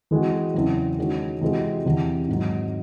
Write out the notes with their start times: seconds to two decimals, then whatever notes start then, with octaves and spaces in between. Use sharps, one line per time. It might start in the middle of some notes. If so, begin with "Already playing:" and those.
0.11 E3 G#3 C4 F#4
0.54 E2 C#3 F#3 C4 E4
0.98 D#3 G#3 C#4 F#4
1.41 C3 E3 G#3 C4 F#4
1.85 E2 C3 E3
2.28 G#2 D#3 F#3